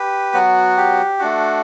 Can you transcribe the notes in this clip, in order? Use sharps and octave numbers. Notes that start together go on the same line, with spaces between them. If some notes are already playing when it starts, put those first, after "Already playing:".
Already playing: G4 B4
F#3 B3 F#4
G4
A3 D4 F#4